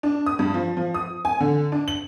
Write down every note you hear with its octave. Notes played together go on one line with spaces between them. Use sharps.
D4
D#6
G2
F3
F3
D#6
G#5
D3
D4
F#7